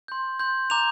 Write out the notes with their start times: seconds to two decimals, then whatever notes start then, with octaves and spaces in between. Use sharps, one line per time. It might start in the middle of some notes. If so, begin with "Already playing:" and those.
0.08 C6 G6
0.39 C6 G6
0.70 A#5 D6 G6 F7